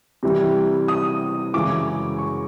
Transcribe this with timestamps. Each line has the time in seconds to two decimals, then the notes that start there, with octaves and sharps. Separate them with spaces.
0.23 C3 E3 G3
0.88 D#6
1.54 F#2 C#3 E3 G#3 D6
2.18 C#6